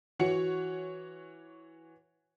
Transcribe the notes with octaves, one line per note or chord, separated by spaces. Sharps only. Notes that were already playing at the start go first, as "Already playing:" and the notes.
E3 F#4 C#5 F#5 C#7